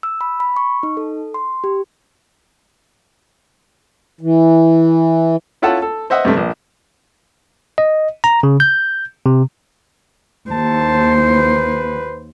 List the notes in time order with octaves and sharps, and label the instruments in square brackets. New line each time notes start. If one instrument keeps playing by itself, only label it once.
[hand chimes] E6
B5
B5
C#6
D#4
A4
C6
G4
[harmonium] E3
[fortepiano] C#4 E4 F4 A4 F#5 A5
A4
C5 D#5 E5 F#5
G2 C3 A3
A#1
[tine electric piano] D#5
A#5
C#3
G6
C3
[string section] D#2 [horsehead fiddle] C5 [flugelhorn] A5
[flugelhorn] B4